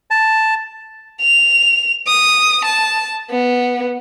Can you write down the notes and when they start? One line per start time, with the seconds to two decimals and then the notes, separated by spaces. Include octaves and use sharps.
0.11 A5
1.22 F7
2.07 D#6
2.65 A5
3.31 B3